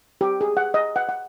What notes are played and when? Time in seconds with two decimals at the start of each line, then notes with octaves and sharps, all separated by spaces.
0.21 G4
0.41 G#4
0.57 F#5
0.74 D#5
0.96 F#5
1.09 F#5